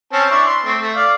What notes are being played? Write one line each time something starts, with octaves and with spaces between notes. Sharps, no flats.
C4 C#4 A5
D4 E4 C#6
C6
A3 C4
A3
D5 F5